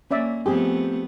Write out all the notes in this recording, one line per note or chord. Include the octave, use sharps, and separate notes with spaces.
A#3 C#4 D5 E5
F3 A3 B3 C4 G4 G#4